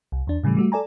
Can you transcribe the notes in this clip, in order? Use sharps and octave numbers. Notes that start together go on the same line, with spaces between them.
C2
E2 D4
A2 C#3 E3 G3 A3
G3 A3 F#4
A4 D5 G#5 A#5